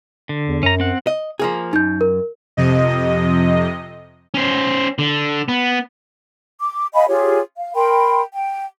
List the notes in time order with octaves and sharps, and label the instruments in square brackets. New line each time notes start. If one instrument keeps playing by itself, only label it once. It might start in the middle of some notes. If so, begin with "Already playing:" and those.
[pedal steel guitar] D3
[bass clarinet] E2
[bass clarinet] F#2 [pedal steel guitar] C#4 A#5
[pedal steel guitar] C4 F#5
[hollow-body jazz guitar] D#5
F3 A#3 G#4
[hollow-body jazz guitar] F#2 [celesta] D#4 G6
[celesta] A#4
[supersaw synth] F2 C3 D#5
[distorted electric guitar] C#4 C5
D3
B3
[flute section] D6
D#5 F5 G#5 B5
F4 G4 G#4 C#5
F5
A#4 G5 B5 C6
G5